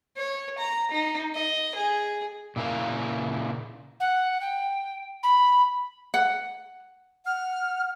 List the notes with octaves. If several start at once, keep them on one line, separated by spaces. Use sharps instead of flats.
C#5
A#5
D#4
D#5
G#4
A#2 C#3 E4 A#4 F5
F#5
G5
B5
F#5
F#5 F6